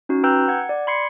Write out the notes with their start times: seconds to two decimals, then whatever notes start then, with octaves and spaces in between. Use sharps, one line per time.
0.09 C#4 D#4 F#4
0.23 B4 G5 A#5 E6 F#6 G6
0.48 F#5 G#6
0.69 D5
0.87 B5 C6 G#6 C7 C#7